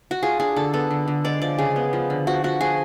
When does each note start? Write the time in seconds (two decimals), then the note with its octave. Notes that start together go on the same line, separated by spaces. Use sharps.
0.11 F#4
0.22 F4 G#4
0.40 D4 G#4
0.56 D3 A4
0.73 B3 A4
0.91 D3
1.08 D3
1.24 G#3 D5
1.42 F3 D5
1.58 C#3 G#4
1.76 B3
1.93 F3
2.10 D3
2.27 F3 F#4
2.44 F3 F#4
2.61 F3 G#4